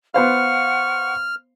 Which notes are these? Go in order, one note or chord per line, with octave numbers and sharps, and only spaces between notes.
B3 C5 F5 F#5 C#6 F6